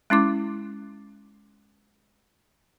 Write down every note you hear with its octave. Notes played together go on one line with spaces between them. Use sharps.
G#3 C#4 E4 D6